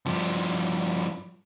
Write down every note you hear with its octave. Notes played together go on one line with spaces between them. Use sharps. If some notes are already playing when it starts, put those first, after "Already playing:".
G2 F3